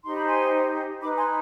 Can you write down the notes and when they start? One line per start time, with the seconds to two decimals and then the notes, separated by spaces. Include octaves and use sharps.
0.04 D#4 G4 C5 C6
0.15 B5
0.26 G#5 C6
1.01 D#4 B4 B5 D6
1.17 G#5 C6